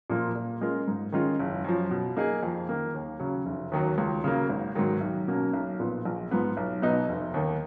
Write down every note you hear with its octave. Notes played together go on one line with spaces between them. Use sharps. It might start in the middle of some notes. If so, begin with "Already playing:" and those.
A#2 F3 A#3 F4
A#2
G#3 C#4 F4 A#4
G#2
D#3 G#3 C#4 F4
F#1
F#2 F3
B2
A#3 D#4 G#4
F2
D#3 A#3
D#2
C#3 F#3 C#4
F1
D#2 D#3 F#3
C#2
C#3 F#3 A#3
G#1
G#2 D#3 F#3
B1
B2 F#3 A#3 C#4
B1
A#2 F3 B3
A#1
G#2 F3 B3
B1
B2 F#3 B3 D#4
F1
D#2 D#3